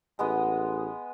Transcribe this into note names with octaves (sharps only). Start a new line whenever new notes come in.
A1 G#3 B3 D#5